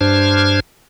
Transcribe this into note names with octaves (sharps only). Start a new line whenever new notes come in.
G2 D4 C5 F6 G#6